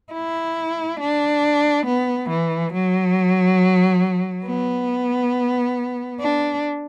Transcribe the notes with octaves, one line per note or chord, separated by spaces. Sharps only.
E4
D4
B3
E3
F#3
B3
D4